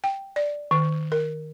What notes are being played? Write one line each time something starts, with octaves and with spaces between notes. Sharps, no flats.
G5
D5
D#3
A#4